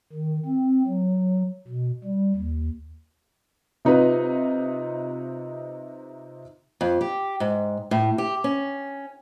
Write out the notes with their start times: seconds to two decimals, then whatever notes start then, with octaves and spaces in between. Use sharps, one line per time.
0.13 D#3
0.46 C4
0.86 F#3
1.68 B2
2.04 G3
2.36 D#2
3.85 C3 D#4 F4 B4
6.81 F2
7.01 G4
7.40 G#2
7.91 A2
8.18 G4
8.44 C#4